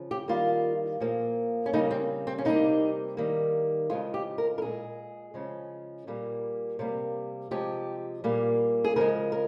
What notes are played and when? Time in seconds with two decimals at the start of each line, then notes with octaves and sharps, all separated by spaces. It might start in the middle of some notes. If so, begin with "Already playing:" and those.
Already playing: C#3 F3
0.11 G4
0.28 D#3 G3 A#3 F4
1.00 A#2 F3 A#3
1.66 C#4
1.73 C#3 G3 A#3 D#4
1.90 C4
2.27 C4
2.38 C#4
2.45 C3 G3 A#3 D#4
3.17 D#3 G3 A#3
3.90 C#3 F3 G#3 F4
4.14 G4
4.38 A#4
4.58 A#4
4.62 A#2 G#3 G#4
5.34 C#3 F3 G#3
6.07 A#2 G3 A#3
6.79 C3 G3 A#3
7.51 C3 F3 G#3 G4
8.24 A#2 G3 A#3
8.84 G#4
8.96 C#3 F3 G#3 A#4
9.32 A#4